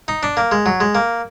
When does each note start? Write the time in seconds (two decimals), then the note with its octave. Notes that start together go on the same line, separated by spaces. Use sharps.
0.08 D#4
0.23 D4
0.37 A#3
0.52 G#3
0.66 F#3
0.80 G#3
0.95 A#3